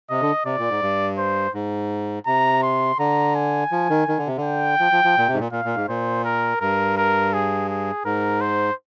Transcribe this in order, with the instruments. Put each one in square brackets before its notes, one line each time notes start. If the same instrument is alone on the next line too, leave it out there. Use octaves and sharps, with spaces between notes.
[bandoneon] C3 [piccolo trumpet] D#5
[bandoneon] D3
[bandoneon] C3 [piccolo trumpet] D5
[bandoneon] A#2
G#2
G2
[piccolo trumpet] C5
[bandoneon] G#2
[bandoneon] C3 [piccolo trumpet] A#5
[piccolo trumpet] C6
[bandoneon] D3 [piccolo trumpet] A#5
[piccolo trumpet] G#5
[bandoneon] F3
D#3
D#3
D3
C3
D3
[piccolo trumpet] G5
[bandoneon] F3
F3
F3
A#2
C3
G#2
A#2
[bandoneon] A#2 [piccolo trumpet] F5
[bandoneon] A#2
G#2
[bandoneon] A#2 [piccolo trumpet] C5
[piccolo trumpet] A#4
[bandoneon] G2 [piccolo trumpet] A#4
[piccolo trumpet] A#4
G#4
G#4
[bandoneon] G#2 [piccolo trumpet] A#4
[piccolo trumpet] C5